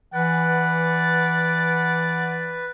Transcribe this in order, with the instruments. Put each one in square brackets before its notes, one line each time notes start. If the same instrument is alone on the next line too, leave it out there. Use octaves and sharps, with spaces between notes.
[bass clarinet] E3 [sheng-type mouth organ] B4 [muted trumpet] D5 [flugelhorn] F#5